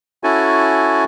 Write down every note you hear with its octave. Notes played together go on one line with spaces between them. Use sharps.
C#4 E4 F#4 A4 G#5